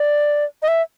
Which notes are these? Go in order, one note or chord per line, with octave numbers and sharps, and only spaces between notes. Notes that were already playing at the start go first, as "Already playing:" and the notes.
Already playing: D5
D#5
E5